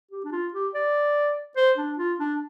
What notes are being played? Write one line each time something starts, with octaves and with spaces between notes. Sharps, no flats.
G4
D4
F4
G4
D5
C5
D4
F4
D4